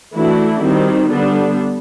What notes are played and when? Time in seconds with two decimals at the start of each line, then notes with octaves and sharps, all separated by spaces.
0.16 E3 A3 D4 E4 F#4
0.62 D#3 G3 C4
1.09 D3 G3 B3 D4